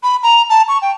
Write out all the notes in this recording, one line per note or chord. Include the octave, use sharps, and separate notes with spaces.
B5
A#5
A5
C#6
G5